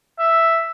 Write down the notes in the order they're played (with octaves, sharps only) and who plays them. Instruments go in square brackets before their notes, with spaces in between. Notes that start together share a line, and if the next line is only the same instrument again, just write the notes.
[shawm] E5